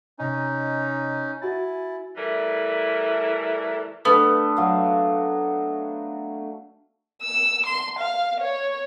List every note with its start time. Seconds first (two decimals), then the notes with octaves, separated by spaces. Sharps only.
0.19 C3 C#4 D#4 D#5 A#5
1.41 E4 F#4 G#5 A6
2.16 E3 G3 A3 E4 A#4
4.05 A3 B3 D4
4.57 F#3 F5
7.22 E6
7.66 C6
7.99 F5
8.40 C#5